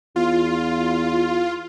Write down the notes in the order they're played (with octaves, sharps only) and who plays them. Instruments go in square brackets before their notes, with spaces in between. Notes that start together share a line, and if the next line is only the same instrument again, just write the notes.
[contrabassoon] E2 [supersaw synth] F4